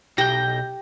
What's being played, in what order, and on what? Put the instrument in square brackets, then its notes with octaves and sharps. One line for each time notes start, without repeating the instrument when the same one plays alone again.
[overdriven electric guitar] B1 [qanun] G4 [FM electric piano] G6 A#6